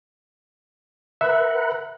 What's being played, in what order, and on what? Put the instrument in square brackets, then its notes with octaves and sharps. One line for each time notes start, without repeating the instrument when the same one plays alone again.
[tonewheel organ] A#4 B4 F#5 [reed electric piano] E5